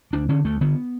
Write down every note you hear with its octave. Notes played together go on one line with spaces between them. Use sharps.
D2 D4
D3 C#4
D2 A3
D3 B3